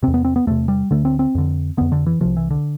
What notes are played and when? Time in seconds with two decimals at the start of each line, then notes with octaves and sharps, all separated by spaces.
0.03 E2 C3 C4
0.14 B3
0.25 C4
0.36 B3
0.47 E2 C3 A3
0.68 G3
0.91 D2 D3 A3
1.05 C4
1.19 C4
1.35 F2 D3
1.77 F2 D3 B3
1.92 D3
2.06 E3
2.21 C2 C3 F3
2.37 E3
2.51 D3